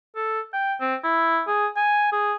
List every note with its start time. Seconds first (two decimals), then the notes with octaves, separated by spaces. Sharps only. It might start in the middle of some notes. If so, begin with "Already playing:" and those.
0.16 A4
0.53 G5
0.81 C4
1.04 E4
1.47 G#4
1.76 G#5
2.12 G#4